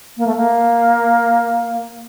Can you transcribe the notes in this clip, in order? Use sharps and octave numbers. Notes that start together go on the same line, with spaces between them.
A#3
A3
A#3